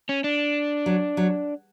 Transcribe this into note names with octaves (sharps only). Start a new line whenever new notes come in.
C#4
D4
F#3
F#3